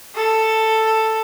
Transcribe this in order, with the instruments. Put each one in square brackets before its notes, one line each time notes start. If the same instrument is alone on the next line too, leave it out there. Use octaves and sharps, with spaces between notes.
[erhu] A4